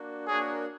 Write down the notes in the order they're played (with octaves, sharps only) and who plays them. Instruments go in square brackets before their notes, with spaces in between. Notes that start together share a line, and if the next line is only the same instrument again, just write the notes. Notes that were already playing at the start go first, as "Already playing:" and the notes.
Already playing: [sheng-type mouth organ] A#3 D4 F#4
[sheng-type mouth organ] A#3 D4 F#4 A#4 C#5 [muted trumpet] G#4